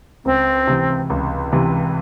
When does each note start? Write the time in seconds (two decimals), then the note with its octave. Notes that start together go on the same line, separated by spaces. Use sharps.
0.25 C#2 C4
0.67 C3 E3
1.10 C#2
1.52 C3 E3